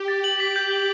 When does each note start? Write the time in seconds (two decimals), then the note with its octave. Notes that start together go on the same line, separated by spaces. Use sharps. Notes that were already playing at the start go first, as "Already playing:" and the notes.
Already playing: G4
0.08 A6
0.24 F#7
0.40 B6
0.56 G6
0.71 G7